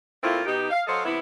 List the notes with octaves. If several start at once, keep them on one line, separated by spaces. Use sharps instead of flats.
A#2 A3 C4 E4 F4
B2 D#4 G4
F5
F#3 A4 C5 C#5 D#5 F5
C3 E3 B3 E4